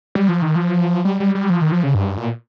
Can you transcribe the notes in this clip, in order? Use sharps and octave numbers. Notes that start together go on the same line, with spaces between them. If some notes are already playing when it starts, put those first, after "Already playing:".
G3
F3
D#3
F3
G3
G3
G3
F3
D#3
F3
C#3
G2
A#2